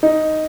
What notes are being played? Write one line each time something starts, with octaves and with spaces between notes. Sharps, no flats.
D#4